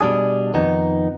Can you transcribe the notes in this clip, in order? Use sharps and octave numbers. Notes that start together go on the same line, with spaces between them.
B2 G3 D4 G#4
F2 D#3 B3 D#4